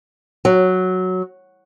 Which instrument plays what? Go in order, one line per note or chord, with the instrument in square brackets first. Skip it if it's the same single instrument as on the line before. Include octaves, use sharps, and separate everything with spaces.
[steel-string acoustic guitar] F#3